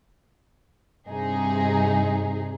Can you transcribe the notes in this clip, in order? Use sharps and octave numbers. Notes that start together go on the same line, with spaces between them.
G2 C3 D#4 G#4